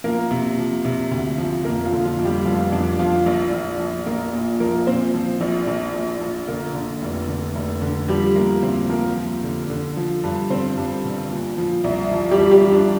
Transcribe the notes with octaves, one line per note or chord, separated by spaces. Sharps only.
F3 A#3 A#4
C3
F3
C3
D2
F3
F2 A#3 A#4
F3 F4
D3
F3 F4
F2
G3 G4
F1 F3 F4
F2 D4
F3 F4
A#1
A#1
F3
A#1 A#3 A#4
A#2
F3 A#3 A#4
A#2 C4 C5
F3
A#1
A#1
A#1
A#1
D3 A#3 A#4
D3
F1
D3
F1
D3
F3 G3 G4
F3 A#3 A#4
D2 C4 C5
F3 A#3 A#4
F3
D3
D3
F3
G2
D3 C4 C5
G2
G1
A#2
F3
C2
F3
G3 G4
F3
G3 G4
F3
D4